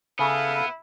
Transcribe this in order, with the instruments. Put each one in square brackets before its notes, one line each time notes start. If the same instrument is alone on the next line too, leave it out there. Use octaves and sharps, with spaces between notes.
[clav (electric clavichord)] C#3 [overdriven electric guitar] B3 [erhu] E4 [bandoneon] A4 F5